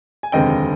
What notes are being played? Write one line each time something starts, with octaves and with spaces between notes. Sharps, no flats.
G#5
F1 D#2 D3 G#3 C4 D#5 G5